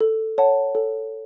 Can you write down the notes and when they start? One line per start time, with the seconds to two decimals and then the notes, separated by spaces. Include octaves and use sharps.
0.01 A4
0.38 C#5 F#5 A5
0.75 A4